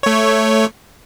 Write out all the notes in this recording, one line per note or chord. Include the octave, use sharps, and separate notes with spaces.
A3 C#5